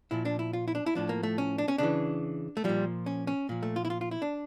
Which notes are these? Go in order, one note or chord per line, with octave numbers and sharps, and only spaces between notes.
A#2 F3 E4
D4
E4
F4
E4
D4
E4
A2 F3 D4
A#3
A3
C#4
D4
C#4
C#3 E3 D4
A3
A#2 F3 G3
C#4
C#4
A#2 F3
A3
F4
E4
F4
F4
E4
D4